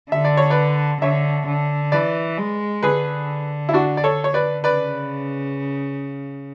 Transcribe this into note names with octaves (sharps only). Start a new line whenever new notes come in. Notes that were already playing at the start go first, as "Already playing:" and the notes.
D3 E5
D5
C#5
B4 D5
D3 C#5 E5
D3
E3 B4 D5
G#3
D3 G#4 B4
E4
D4 F#4
D5
A4 C#5
C#5
B4 D5
C#3 B4 D5